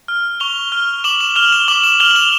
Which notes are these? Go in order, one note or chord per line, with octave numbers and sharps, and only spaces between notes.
F6
C#6 F7 G7
F6
D6 E7 F#7
E7 F#7
F6 F7 G7
E7 F#7
D6 E7 F#7
E7 F#7
F6 F7 G7
F7
E7 F#7